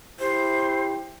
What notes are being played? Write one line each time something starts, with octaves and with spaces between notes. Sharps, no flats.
E4 G4 C5